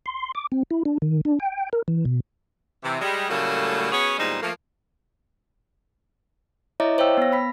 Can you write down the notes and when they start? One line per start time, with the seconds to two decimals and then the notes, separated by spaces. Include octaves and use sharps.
0.06 C6
0.35 D6
0.52 C4
0.71 E4
0.85 D4
1.02 D#3
1.25 D4
1.40 G5
1.73 A#4
1.88 E3
2.05 B2
2.84 C3 E3
3.01 G3 G#3
3.29 A2 C#3 F#3 G3 A3 A#3
3.92 B3 C#4 F#4 G#4 C#5
4.18 E2 A#2 G3 G#3 D#4 C5
4.42 F3 A3 A#3
6.80 E4 C#5 D#5 E5 A#5 D6
6.98 C5 C#5 F5 G5 E6
7.17 B3 A#6
7.32 B5 B6